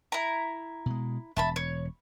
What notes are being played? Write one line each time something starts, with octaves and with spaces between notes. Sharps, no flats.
E4 A#5
B2 G#3
E1 E5 A5 B5
C#5